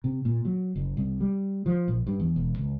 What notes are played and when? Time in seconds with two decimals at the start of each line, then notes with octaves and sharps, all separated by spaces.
0.04 C3
0.25 A#2
0.45 F#3
0.75 F#1
0.97 C2
1.20 G3
1.66 F3
1.88 A#1
2.07 G2
2.20 E2
2.36 E1
2.58 C#2